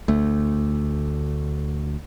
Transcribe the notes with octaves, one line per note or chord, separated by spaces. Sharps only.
D2 A3